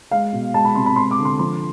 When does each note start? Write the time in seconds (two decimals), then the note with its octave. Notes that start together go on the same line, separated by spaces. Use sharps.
0.11 G#3 F5
0.33 B2
0.54 G#3 A5
0.65 B5
0.75 C3 C6
0.86 B5
0.96 G#3 C6
1.11 D6
1.19 D3
1.25 C6
1.39 F3 C6